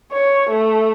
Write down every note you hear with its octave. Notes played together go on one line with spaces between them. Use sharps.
C#5
A3